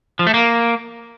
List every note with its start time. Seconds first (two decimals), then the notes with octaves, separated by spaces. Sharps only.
0.19 F3
0.27 A3
0.34 A#3